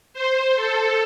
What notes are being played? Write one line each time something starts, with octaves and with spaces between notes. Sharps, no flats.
C5
A4